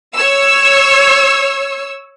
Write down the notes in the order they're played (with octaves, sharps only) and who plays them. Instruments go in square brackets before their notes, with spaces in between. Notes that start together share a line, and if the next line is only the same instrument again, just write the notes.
[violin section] C#5 E6